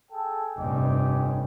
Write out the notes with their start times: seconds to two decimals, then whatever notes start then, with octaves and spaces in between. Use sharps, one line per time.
0.12 G#4 A4 G5
0.58 F1 G2 C#4 G4 D#5